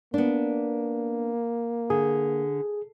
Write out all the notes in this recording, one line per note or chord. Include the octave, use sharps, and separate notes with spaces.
A#3 B3 D4
D3 G#4